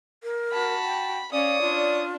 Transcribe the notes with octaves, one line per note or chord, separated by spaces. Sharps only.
A#4
F#4 A5 B5
G5
C#4 C#5 D5 F5 D#6
D4 F4